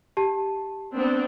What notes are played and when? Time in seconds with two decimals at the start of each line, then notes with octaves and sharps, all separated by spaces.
0.17 G4 A5
0.93 B3 C4 D4